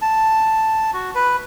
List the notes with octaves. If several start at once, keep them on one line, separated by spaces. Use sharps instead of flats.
A5
F#4
B4